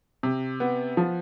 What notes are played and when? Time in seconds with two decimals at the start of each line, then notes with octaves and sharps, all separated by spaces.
0.23 C3
0.60 B3
0.97 F3